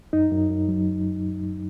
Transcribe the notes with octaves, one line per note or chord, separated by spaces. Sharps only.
F#2 D#4
F#2
F#2
F#3